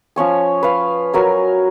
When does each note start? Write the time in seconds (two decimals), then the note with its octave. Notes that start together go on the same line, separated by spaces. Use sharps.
0.16 F3 C#4 C#5 G#5
0.63 B4 F5
1.13 F#3 A#4 G#5